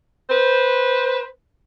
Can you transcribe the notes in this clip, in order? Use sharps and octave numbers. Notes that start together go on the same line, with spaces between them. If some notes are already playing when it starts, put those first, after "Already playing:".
B4 C5